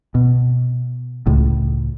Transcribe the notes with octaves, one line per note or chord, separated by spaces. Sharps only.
B2
C#2 A2